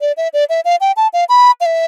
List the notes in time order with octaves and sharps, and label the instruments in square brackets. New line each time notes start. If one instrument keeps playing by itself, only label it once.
[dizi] D5
E5
D5
E5
F5
G5
A5
F5
B5
F5
E5